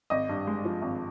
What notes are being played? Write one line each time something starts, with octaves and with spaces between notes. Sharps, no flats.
G#1 D#5
G2
G#3
F3
G#1